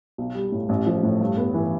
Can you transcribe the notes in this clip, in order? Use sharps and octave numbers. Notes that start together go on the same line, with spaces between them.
B1
G3
A2
A1
F3
A2
G2
B3
E3